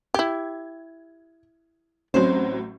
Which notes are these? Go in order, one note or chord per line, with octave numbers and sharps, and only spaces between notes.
E4 G4 G#6
A1 A2 F#3 C4 C#4 C5